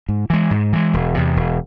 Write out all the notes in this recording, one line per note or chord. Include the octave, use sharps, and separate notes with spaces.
G#2
E3 G#3
G#2
E3 G#3
E1
E2 C3
E1